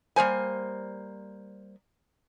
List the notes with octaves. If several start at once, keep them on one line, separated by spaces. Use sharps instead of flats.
G3 A#3 C5 G#5